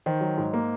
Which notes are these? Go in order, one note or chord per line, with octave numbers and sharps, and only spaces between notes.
D#3 C5
F#3
G#2
A#3